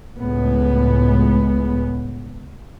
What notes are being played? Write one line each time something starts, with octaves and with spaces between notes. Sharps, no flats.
C#2 A2 G#3 B3